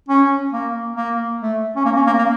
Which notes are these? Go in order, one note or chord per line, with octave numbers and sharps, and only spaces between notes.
C#4
A#3
A#3
A3
C#4
A#3
C#4
A#3
A#3